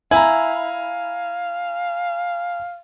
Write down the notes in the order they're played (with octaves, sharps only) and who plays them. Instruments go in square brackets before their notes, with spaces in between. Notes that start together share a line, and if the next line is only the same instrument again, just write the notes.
[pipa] E4 [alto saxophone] F5 [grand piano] G#5 A#5